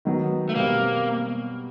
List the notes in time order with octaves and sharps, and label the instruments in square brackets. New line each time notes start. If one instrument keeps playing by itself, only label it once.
[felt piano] D#3 F#3 B3
[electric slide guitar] A3
[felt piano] B2 G3 C4 [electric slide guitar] A#3